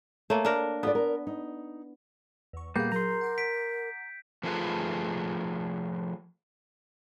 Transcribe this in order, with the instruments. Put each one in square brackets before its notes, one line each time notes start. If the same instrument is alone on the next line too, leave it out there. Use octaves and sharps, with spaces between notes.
[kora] A3 A#3 [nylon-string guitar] C#5
[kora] D4 A#4
[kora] B3 [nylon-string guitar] F4 A4 D5
[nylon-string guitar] A#4
D#4
[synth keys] E2 C#6
[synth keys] A#2 G#4 F5 [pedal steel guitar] G3 A#3 B3 [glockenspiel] G6
[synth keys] F#3 G#4 [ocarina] A#4 [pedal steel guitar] A#5 C6
[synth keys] F#5 D6 C7
[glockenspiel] B6 D7
[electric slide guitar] F3 A3 F4 G#4 B4